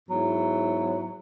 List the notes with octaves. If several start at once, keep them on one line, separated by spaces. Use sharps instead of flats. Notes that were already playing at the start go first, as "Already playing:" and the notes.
G#2 F#3 B3 E4